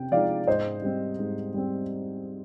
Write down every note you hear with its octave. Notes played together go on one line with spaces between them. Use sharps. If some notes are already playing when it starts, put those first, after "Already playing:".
Already playing: C3 G5
F3 G#3 D#4 D5 F5
G#2 C5 D#5
G3 C4
G#2
G3 C4